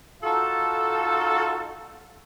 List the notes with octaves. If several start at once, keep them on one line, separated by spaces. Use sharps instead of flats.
D#4 F4 F#4 A4